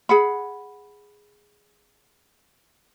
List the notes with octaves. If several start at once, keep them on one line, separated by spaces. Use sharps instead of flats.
G#4 F#5 B5